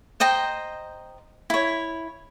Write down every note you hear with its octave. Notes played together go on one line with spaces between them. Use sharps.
C5 D#5 G5 A#5
E4 C#5